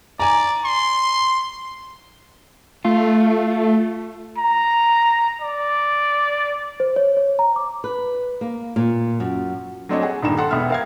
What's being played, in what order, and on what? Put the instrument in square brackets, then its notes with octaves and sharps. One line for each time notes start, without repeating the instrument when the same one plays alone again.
[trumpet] D5 [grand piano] G#5 A#5
[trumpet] C6
[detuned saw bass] A3 [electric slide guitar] F4
[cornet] A#5
D5
[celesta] C5
C#5
C#5
A#5
D6
[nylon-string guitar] B4
A#3
A#2
F#2
[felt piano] F#3 A3 C4 D4 C#5 D#5
G#4 F#5
D#1 G2 D#3 A#5 E7
A4 F#5 C6
E1 B3 E5 F6
A#4 F5 G#6